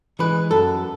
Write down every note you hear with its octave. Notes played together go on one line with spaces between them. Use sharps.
E3 G#3 B4
F#2 A4